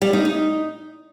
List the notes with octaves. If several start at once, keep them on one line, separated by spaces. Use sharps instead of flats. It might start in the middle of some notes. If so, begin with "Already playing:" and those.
G3
D#4
D#4